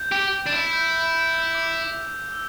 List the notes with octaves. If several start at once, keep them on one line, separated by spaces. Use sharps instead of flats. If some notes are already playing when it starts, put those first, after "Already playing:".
Already playing: G6
G4
D4
E4
G6
G6
G6
E6
D6
E6